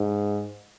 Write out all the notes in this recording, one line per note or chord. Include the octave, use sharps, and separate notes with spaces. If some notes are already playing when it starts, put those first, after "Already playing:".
Already playing: G#2